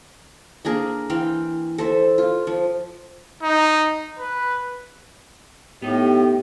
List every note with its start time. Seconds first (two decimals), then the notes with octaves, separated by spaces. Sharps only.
0.65 A#3 D4 G#4 A#4
1.10 E3 F5 G5 C6
1.78 A4 C5 E5
2.18 F4
2.47 F3
3.43 D#4
4.19 B4
5.82 A2 B3 D#4 G4